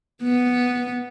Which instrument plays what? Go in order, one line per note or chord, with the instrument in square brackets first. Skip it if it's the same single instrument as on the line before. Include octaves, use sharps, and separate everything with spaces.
[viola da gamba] B3